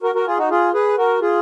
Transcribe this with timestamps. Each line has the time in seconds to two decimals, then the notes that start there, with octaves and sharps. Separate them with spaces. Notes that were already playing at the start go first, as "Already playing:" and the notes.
0.03 F#4 A#4
0.15 F#4 A#4
0.27 F4 G#4
0.38 D#4 F#4
0.50 F4 G#4
0.74 G#4 B4
0.98 F#4 A#4
1.21 F4 G#4